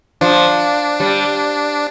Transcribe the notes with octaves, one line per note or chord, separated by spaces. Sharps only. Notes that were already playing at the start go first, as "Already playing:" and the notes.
F3 D4
G3